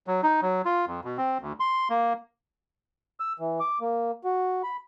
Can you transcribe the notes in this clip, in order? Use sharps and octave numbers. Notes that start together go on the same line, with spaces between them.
F#3
D#4
F#3
F4
F2
B2
C4
D2
C6
A#3
E6
E3
D6
A#3
F#4
B5